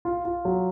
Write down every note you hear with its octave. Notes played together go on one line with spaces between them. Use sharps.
F4
F4
F#3